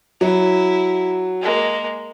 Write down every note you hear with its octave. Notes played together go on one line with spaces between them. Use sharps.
F#3 E4
G#3 A#3